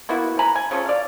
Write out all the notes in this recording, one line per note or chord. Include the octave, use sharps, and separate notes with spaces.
A#3 B3 E4 F#4
G#5 A#5 B5
G#5
C#3 F3 A3 C#4
D5 F5